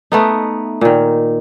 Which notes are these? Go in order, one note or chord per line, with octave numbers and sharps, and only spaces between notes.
A3 B3 D#4
A#2 D#3